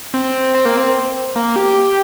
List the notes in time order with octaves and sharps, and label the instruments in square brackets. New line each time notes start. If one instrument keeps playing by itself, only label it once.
[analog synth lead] C4
C4
A#3
C4
A#3
G4